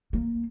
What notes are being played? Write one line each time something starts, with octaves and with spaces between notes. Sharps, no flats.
A#3